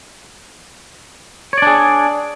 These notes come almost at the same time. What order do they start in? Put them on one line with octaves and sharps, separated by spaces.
C#5 D5 D4 G#4